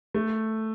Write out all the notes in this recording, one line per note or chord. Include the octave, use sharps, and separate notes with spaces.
A3